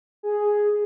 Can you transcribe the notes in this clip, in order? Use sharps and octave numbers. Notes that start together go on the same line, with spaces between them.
G#4